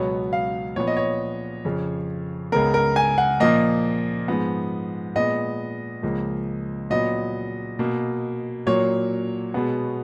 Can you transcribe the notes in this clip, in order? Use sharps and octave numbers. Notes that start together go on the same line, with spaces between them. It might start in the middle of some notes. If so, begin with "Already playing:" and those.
Already playing: C#2 B2 F#3 B3 C#5
F5
A#2 F3 B3 C#5
D#5
C#5
F2 C#3 F3
C#2 C#3 G#3 B3 A#4
A#4
G#5
F#5
A#2 F3 A#3 D#5
G#2 F3 B3
A#2 G#3 B3 D#5
C#2 C#3 F3 A#3
A#2 F#3 B3 D#5
B2 A#3
A#2 F#3 A#3 C#5
B2 G#3 B3